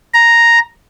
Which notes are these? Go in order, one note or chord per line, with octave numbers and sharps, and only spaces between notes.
A#5